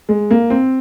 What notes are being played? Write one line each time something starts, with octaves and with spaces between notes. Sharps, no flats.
G#3
A#3
C4